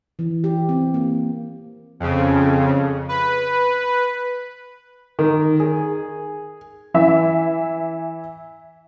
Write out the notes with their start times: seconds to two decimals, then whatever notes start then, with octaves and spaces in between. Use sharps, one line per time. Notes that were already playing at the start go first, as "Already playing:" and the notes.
0.19 E3
0.44 G4
0.69 C4
0.94 A#3
2.00 F2 C#3
3.09 B4
5.19 D#3
5.60 G#4
6.94 E3 E5